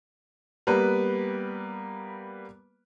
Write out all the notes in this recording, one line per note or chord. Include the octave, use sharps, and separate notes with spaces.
G3 A#3 B3 B4